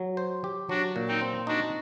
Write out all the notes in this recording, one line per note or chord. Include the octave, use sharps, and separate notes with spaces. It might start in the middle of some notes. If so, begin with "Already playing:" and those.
Already playing: F#3
C5
G4
F#3 D4 F#4
A#2
C4 D#4
C4
D4 D#4 F#4